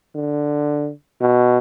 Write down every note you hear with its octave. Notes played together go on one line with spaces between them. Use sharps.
D3
B2